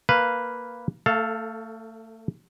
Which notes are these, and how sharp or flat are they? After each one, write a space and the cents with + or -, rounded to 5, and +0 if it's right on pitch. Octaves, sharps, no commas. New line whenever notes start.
A#3 +0 B4 +0 F5 +0
A3 +30 A4 +0 F5 +0